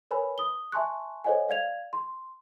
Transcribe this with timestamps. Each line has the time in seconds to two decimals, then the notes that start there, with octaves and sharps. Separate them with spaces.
0.11 A#4 B4 C#5 G#5 B5
0.38 D#6 G7
0.72 E5 G#5 A5 C6 C#6 F#6
1.24 A4 C5 C#5 D#5 F#5 G#5
1.49 D5 F5 G#6 F7
1.93 C6